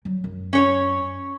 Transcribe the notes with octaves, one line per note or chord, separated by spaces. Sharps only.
F#3 G3
F#2
C#4 C#5